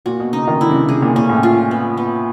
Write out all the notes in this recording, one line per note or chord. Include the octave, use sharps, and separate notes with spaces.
A#2 F#4
B2
C#3 D#4
D#3
D3 E4
C3
C#3
C3 G#4
A#2
A#2 C#4
A2
F4
B3
B3